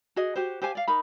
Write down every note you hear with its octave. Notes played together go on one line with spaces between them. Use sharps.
F#4 G#4 D#5
F#4 G4 C5
G4 C5 F5 G#5
D5 F5
D#4 A#4 B5